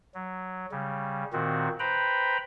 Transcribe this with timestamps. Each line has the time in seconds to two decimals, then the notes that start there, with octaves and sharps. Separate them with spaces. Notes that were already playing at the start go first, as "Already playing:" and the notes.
0.14 F#3
0.71 C#3 G3
1.33 A#2 D#3 C4 F#4
1.80 B4 C5 G5 A#5 B5